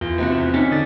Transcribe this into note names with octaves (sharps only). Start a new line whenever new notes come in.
E2 F4
C3 F#4 F#5
E5
C4 C#4 D#4 D5 B6 C#7
D3 D#6 A6